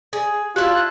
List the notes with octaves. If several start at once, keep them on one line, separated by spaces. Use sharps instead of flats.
G#4
E4 F4 G4 A5 F#6